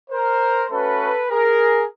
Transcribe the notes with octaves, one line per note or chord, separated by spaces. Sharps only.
A#4 C5
A3 C#4 F#4 A4 B4
G#4 A#4